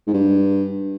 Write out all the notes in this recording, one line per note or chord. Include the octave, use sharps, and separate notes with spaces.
G#2
G2